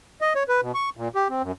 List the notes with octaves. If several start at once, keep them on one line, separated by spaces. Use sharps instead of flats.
D#5
C#5
B4
B2
C#6
A#2
G4
C4
F#2